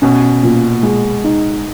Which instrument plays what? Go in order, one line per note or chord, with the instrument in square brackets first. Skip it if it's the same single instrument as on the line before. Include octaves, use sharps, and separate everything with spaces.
[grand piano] B2 [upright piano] C#4
[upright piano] A#2
G#3
D#4